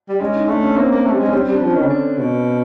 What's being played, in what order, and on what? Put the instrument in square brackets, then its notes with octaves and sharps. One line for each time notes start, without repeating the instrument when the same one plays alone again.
[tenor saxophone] G3
[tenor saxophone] G#3 [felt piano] C#4
[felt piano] D#4
[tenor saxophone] A3 [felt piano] D4
[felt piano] C#4
[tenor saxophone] A#3 [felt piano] C4
[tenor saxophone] A#3
A3
G3
G#3
[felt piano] C#4
[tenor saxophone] G3 [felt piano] C4
[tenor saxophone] G3 [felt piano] D4
[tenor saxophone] F3
[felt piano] C#4
[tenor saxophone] D#3
C#3
D3
B2